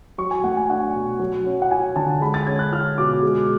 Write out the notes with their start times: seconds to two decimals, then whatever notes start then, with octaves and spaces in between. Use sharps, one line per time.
0.18 F#3 C#6
0.31 G#5
0.44 A3 F#5
0.57 G#5
0.70 D4 F#5
0.94 B2
1.20 F#3
1.46 C#4
1.62 F#5
1.71 F4 G#5
1.96 D3 A5
2.21 G#3 B5
2.34 A6
2.47 C#4 G#6
2.59 F#6
2.72 F4 F6
2.98 B2 D6
3.23 G#3